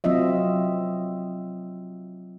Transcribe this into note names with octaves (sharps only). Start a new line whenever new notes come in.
F#3 C4 F4 D#5 E5